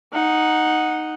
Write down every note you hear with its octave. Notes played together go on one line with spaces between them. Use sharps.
D#4 F#5